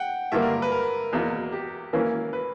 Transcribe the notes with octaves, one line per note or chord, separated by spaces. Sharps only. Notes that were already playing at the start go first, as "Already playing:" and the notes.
Already playing: F#5 G5
G2 D3 A#3 E5
A#4
B4
A#4
E2 B2 A#3
G4
E3 A#3 C#4
B4